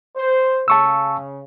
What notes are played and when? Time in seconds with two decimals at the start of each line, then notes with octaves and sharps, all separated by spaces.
0.15 C5
0.68 C#3 A5 C#6 E6